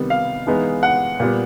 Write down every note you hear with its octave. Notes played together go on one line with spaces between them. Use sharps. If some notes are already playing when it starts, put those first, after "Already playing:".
Already playing: C3 D#3 G3 B3
F5
E3 G#3 B3 D#4
F#5
A#2 G3 B3